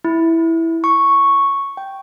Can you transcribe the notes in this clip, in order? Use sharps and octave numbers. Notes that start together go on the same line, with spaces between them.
E4
C#6
G5